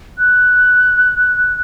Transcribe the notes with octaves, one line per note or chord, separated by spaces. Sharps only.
F#6